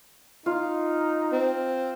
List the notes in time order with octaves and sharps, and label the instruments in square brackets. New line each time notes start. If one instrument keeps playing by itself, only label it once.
[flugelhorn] D#4 [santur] F4
[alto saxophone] C4